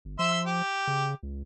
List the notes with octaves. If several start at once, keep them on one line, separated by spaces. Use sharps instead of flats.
G1
F3 E5 C6 E6
G4
C#3
C#2